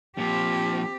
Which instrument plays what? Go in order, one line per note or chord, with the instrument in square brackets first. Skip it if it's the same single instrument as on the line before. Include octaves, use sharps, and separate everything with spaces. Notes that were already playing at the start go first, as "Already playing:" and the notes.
[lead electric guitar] A#2 F3 [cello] C4 G4